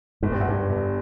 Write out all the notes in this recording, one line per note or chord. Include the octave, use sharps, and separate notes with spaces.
G1 G#2
G2
F#2
G1 G2
G1